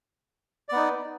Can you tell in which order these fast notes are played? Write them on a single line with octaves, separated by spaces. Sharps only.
D5 B3 D#4